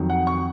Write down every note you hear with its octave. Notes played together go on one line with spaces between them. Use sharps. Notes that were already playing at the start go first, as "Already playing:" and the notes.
Already playing: F2 D#3 F#3
F#5
C#6